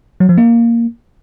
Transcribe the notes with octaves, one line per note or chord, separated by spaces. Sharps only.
F#3
F3
A#3